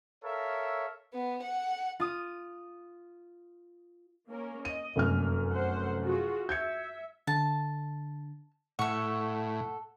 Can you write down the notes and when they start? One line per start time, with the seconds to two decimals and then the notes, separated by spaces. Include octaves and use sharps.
0.23 A4 A#4 C#5 E5 F5
1.13 B3
1.43 F#5
2.00 F4 D#6
4.29 A#3 C#4 A#4
4.65 D#5 D#7
4.96 F1 F#2 A#3 F6
5.51 C5 F#5
6.03 F4 F#4 G#4
6.49 E5 G6 G#6 C#7
7.27 D3 A5
8.79 A2 A4 F#5 C#6